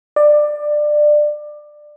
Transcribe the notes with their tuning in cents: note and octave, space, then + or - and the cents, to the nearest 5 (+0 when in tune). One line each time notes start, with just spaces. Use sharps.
D5 +20